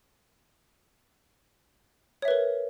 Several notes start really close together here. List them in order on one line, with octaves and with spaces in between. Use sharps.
C#5 E5 B4 A#4